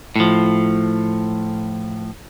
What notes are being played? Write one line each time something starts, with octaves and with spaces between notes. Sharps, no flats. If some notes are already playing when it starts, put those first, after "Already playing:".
A2 F3